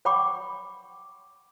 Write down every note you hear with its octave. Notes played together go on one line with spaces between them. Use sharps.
C#5 F#5 G5 B5 C#6 D6